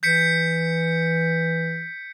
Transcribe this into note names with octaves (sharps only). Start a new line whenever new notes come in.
E3 G6 B6 C#7